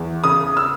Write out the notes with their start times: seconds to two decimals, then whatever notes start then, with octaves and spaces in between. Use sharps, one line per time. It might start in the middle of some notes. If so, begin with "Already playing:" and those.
Already playing: E2
0.24 C#3 D#6
0.57 E6